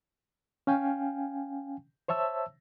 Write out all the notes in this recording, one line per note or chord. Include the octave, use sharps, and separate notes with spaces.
C#4 F5 G5 G#5
C5 C#5 E5 A5 E6